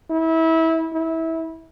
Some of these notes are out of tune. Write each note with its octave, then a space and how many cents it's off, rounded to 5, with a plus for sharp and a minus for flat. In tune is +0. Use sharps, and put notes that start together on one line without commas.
E4 -25
E4 -20